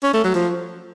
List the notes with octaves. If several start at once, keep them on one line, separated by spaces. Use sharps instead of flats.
C#4
A3
F#3
F3